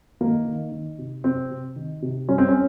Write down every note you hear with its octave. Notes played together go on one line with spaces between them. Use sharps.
D#3 A#3
D#3
D#3
C3
C3 C4
C3
D#3
C3
G3 C#4
C4
C#4